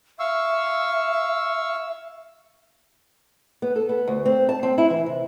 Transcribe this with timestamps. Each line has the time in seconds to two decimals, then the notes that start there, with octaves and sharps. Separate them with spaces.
0.19 E5 F5 C#6 E6
3.62 B3
3.76 A4
3.89 B3
4.07 D2
4.26 C4
4.49 A5
4.63 C4
4.78 E4
4.90 E3
5.06 C3